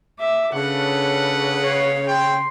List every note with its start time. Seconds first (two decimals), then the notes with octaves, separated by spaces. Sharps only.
0.20 E5 D6
0.54 C#3 D4 A4 B4 F#5
1.62 C#5 F5
2.08 C#5 G5 C6